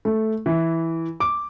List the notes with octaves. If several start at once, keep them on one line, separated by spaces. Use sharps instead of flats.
A3
E3
D6